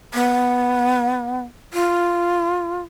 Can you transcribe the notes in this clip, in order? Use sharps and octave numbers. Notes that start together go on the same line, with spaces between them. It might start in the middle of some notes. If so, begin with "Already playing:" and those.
B3
F4